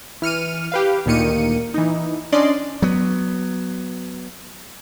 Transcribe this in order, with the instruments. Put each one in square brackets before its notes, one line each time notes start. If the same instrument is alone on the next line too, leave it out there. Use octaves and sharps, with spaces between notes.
[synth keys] E3 F6 C#7 D#7
G4 B4 F5
D2 A#2 D#3 A#3 C#7 D#7
E3 D#4
C#4 D4 D5 D#5 C6
[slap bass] F#3 B3